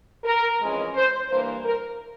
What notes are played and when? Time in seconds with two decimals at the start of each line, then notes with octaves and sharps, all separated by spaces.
0.24 A#4
0.60 F2 E3 G#3 C#4
0.94 C5
1.29 G2 E3 A#3 C5
1.64 A#4